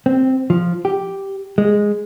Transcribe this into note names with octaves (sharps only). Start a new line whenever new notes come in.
C4
F3
G4
G#3